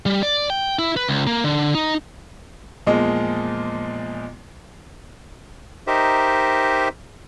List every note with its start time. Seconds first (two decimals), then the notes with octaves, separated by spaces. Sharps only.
0.06 G3
0.23 D5
0.50 G5
0.79 E4
0.97 B4
1.09 C#2
1.27 A#3
1.44 D3
1.75 D#4
2.87 E2 A#2 F3 G#3 D#5
5.87 D#4 G4 A#4 C5 D#5 E5